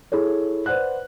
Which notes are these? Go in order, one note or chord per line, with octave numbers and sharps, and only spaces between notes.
E4 G#4 A4 C#5
B4 C5 D5 F#5 F#6